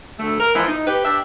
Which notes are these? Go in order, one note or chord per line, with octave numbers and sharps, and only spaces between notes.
D2 A3
A#4
E3 F3 G#3 B3
D#4
G4 B4
D4 G4 E5